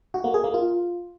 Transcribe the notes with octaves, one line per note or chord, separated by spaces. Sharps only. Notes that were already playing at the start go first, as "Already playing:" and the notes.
F#4
A#3
G#4
A#3
F4